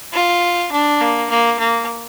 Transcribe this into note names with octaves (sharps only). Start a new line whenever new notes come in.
F4
D4
A#3
A#3
A#3